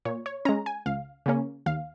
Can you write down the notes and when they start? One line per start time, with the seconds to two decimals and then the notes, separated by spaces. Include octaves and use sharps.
0.05 A#2 C#5
0.26 C#5
0.45 G#3 C#4 A#5
0.66 G#5
0.86 C#2 F5
1.26 C#3 A#3 C#4
1.66 D#2 F5